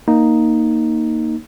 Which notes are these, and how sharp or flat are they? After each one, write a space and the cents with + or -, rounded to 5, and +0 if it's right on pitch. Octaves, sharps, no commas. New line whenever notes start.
A#3 +0 D#4 +0